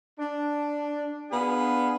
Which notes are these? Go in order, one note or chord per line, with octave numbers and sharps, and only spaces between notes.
D4
B3 D4 G#4 F5